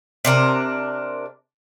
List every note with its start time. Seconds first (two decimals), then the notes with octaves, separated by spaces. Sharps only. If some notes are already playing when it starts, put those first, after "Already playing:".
0.25 C3 D4 A#4